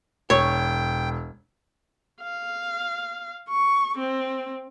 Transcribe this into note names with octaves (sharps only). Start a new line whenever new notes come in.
E1 C#5 G5
F5
C#6
C4